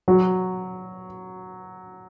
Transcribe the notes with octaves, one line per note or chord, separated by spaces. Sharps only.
F#3